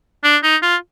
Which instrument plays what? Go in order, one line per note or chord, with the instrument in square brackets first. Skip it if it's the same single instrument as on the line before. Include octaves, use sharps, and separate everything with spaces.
[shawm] D4
D#4
F4